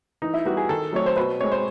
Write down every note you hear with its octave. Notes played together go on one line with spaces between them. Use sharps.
E3 D#4
E4
G3 B3 F#4
G#4
D#3 A4
F#3 A3 C4 C#5
C5
B2 B4
G#3 C4 C#5
C5